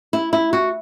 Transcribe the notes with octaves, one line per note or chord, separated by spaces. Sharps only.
E4
E4
F#4